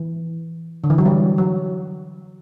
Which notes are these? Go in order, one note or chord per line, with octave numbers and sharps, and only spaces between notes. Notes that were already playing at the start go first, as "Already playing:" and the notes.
Already playing: E3
D3
E3
F#3
G3
F#3